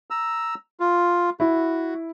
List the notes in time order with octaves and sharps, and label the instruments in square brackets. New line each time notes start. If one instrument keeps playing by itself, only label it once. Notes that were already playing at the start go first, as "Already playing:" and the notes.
[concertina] A#5 E6
F4
[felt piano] E4 [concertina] F#4